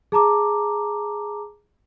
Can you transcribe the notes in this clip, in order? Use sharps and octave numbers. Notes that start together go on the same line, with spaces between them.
G#4 A5 A#5 D6